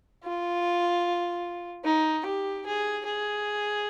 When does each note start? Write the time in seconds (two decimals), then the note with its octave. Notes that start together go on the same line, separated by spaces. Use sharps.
0.24 F4
1.84 D#4
2.25 G4
2.66 G#4
3.05 G#4